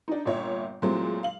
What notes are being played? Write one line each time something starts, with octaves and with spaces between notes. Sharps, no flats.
D4 D#4
G1 A#2 C#5 E5
A#2 E3 F#3 G#3 A3 C4
F5 F#7